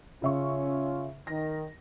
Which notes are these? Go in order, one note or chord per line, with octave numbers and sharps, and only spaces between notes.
C#3 C#4 F4 E5 C#6
D#3 A#6